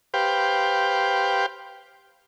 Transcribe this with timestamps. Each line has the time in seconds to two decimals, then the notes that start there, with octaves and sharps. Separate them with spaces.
0.14 G4 B4 C5 F5 G5